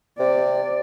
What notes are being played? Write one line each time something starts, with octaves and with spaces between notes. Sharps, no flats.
C3 D5